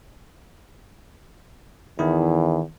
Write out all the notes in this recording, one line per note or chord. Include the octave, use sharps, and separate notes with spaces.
E2 D#3 E4